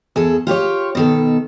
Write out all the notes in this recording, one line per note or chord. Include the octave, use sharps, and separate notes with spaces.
E2 G#4 A4
F4 G4 B4 C#5
B2 D#3 A4